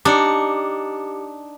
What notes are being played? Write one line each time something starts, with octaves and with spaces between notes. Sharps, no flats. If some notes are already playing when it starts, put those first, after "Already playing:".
D4 D#4 G4 C#7